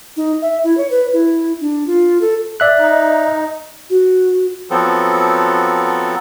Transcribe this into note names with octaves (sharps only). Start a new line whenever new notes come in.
D#4
E5
E4
C#5
B4
E4
D4
F4
A4
D5 E5 F#6
D#4
F#4
F3 F#3 B3 C4 A4